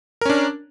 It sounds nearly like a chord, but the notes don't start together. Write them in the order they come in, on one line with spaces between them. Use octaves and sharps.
A#4 C#4 D4